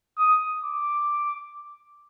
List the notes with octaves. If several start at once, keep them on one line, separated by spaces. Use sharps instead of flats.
D#6
D6